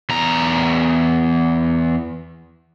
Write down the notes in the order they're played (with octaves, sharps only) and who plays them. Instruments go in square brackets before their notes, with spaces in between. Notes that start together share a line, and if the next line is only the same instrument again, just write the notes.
[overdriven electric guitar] E2 A#5